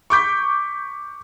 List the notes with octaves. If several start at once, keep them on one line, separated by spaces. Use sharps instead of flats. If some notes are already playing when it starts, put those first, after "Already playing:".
C#6 D6 G6 B6